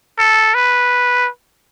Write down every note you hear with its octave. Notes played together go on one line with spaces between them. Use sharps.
A4
B4